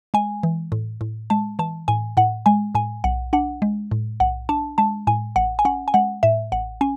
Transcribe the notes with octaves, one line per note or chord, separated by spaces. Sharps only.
G#3 G#5
E3
A2
A2
G#3 A5
E3 A5
A2 G#5
A2 F#5
G#3 G#5
A2 G#5
B1 F#5
D4 F#5
G#3
A2
B1 F#5
D4 A5
G#3 A5
A2 G#5
A1 F#5
G#5
C#4 F#5
G#5
G#3 F#5
A2 E5
A1 F#5
C#4 G#5